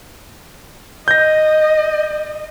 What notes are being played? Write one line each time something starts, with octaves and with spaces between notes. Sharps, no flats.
D#5 G6 A#6